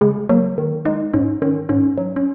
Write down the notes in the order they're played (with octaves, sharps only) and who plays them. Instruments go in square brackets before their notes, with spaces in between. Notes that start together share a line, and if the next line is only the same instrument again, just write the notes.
[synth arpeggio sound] C#3 [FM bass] G#3
[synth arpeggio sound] F#3 [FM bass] A#3
[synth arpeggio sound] D#3
[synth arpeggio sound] G#3 [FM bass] D#4
[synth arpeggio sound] G#2 [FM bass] C#4
[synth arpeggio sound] D#3 [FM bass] C#4
[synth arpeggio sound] G#2 [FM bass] C#4
[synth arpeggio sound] F#3
[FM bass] C#4